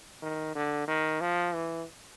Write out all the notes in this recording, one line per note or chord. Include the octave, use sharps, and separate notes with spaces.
D#3
D3
D#3
F3
E3